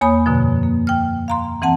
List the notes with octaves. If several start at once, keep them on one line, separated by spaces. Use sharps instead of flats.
E2 A#3 C#5 G#5 B5 D#6
F#2 B2 D3 F3
A#3
G5 F6
F5 A#5 C6
E3 C4 F#5 A5